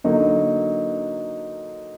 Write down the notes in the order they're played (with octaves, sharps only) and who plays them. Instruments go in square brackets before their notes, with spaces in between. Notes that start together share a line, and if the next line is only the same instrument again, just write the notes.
[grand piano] D3 F#3 A#3 D#4